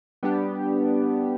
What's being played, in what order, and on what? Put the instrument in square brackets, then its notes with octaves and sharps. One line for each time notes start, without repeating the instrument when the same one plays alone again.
[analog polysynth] G3 B3 D4 G4